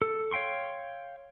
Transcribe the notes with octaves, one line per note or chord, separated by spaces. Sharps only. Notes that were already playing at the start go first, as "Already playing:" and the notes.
A4
C#5 F5 G5 C6 C#6